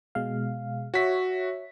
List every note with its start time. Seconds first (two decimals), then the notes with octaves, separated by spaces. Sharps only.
0.15 B2 G#3 F5
0.94 F#4 C#5 E5 B6